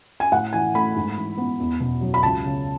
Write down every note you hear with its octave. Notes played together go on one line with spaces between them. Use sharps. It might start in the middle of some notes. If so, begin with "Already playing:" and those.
G#5
A2 F#5
E3 G#5
A3 B5
G#2
E3
B3
E2
B2
F#3
B5
C#2 A5
C#3